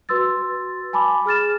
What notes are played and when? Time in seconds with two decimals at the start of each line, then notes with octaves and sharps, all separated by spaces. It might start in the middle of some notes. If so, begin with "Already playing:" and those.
0.09 F#4 B4 C6 E6 A6
0.93 G#5 A5 B5 D6
1.26 G#4 F6 A6 E7